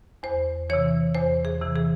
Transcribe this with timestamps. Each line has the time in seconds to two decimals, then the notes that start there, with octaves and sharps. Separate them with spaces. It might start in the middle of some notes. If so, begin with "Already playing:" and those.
0.23 E2 C5
0.70 C3 E3 C#5
1.15 E2 C5
1.45 G#4
1.61 C3 E3
1.76 G#4